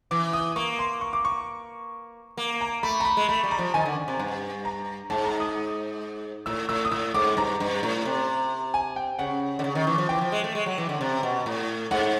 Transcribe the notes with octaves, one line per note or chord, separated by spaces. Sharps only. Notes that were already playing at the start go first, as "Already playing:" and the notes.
E3 D6
D#6
A#3 C#6
C6
C#6
D6
C#6
A#3
A#5
A3 B5
A#5
B5
G#3
A3 B5
G3
A#5
F3
D#3 G#5
D3
C3
G2
A#5
G#2 A5
A#5
D#6
A2 E6
A2 E6
D#6
A2 E6
G#2 D6
G2 A#5
G2
A2
C3
G#5
G5
C#3 F#5
D3
C#3
D#3
E3
F3
E3 G5
F3
G#3
A3
G#3
F#3
E3
D3
C3
B2
A2
G#2 F#5